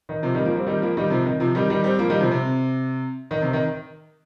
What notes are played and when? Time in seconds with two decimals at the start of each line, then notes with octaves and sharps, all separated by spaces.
0.09 D#3
0.23 C3 F3
0.35 D#3 G3
0.45 F3 A#3
0.55 G3 C4
0.66 D#3 G3
0.82 F3 A#3
0.97 D#3 G3
1.10 C3 F3
1.26 D#3
1.40 C3 F3
1.55 D#3 G3
1.70 D#3 G3
1.84 G3 C4
1.98 F3 A#3
2.09 D#3 G3
2.20 C3 F3
2.31 C3
3.31 D#3
3.42 C3
3.53 D#3